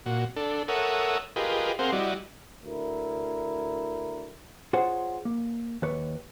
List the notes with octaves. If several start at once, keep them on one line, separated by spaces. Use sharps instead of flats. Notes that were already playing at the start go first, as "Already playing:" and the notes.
A#2 F#4
D4 A4
A4 A#4 C#5 E5 F#5 D#6
F4 G4 G#4 A#4 B4 D#5
C4 G#4 A#4 C5 F5 F#5
G3 E4 F#4 D5 D#5
D2 E4 A#4
F4 G#4 C5 C#5 F#5
A#3
D#2 B4 C#5